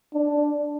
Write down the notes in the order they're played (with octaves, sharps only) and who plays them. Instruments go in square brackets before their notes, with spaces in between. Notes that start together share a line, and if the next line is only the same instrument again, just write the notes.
[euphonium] D4